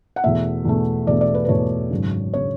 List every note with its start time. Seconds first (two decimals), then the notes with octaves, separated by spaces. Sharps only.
0.16 F#5
0.24 E2 B2 A3 E5
0.65 E2 B2 A3
1.07 E2 B2 A3 D5
1.21 D5
1.35 B4
1.45 B4
1.48 E2 B2 A3 C#5
1.90 G#1 F#2 C#3
2.33 C#3 C#5